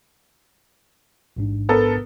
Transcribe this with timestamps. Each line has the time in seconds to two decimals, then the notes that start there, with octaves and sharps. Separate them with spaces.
1.36 A1 G#2 D4
1.69 B3 A4 A#4